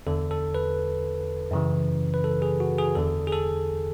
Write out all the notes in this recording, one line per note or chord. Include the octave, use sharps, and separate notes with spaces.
E2 D3 A4
A4
B4
F#2 C#3 E3
B4
A4
G#4
F#4
G#4
E2 D3 A4
G#4
A4